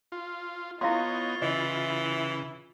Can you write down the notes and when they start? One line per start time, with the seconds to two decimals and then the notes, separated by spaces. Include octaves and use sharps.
0.12 F4
0.81 B3 E4 F4 C#5 D#5 F5 C6
1.42 C#3 E3 E4 D#5